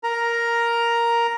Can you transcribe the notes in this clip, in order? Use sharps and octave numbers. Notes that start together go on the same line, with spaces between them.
A#4 A#5